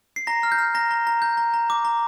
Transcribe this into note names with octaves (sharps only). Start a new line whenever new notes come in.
C7
A#5 A#6
F6
G6
F6
A#5 A#6
A#5
A#5
G6
A#5
A#5
D6
A#5